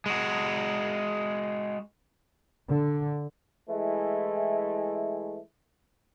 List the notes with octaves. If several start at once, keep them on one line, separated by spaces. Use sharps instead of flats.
G#3 F#4
D3
E3 G#3 A3 E4